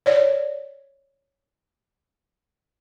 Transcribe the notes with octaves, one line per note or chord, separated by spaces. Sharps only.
C#5 D5